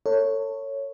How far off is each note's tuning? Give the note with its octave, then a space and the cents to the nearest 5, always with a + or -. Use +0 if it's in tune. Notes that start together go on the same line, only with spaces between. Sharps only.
A4 +35 C#5 +0